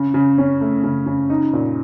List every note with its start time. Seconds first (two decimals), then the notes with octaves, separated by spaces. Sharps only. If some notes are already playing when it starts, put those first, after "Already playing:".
Already playing: C#3
0.14 C#3
0.38 C#4
0.61 A3
0.84 C#3
1.06 C#3
1.30 D#4
1.53 A#2